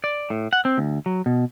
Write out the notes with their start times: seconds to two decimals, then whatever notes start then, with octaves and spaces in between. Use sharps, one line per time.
0.04 D5
0.30 A2
0.53 F#5
0.65 C4
0.78 D2
1.06 F#3
1.26 B2